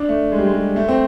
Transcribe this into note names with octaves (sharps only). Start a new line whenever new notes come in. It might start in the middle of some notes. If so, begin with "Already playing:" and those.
Already playing: D4
A3
G#3
G3
G#3
G3
A3
C4